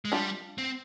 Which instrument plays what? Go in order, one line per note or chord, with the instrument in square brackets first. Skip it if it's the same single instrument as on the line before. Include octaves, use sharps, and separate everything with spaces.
[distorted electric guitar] G#3
[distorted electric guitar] G3 [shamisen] D4 F4
[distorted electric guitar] C4